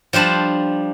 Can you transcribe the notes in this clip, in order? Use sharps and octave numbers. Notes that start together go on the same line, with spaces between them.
F3 G3 D4 C5 A5